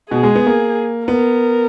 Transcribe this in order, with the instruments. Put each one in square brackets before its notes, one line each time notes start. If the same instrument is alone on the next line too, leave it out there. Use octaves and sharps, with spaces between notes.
[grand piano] B2 [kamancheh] G#4
[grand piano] G#3
B3
A#3
[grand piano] B3 [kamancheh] A#4